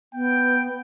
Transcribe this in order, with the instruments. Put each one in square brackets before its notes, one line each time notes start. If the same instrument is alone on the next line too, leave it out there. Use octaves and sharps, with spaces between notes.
[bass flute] B3 [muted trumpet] G5